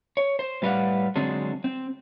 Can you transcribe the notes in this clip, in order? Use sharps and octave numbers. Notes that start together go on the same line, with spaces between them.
C#5
C5
A2 G3 B4 D5 F5 F#5
D3 F#3 G#3 C4 D4 G#4
C4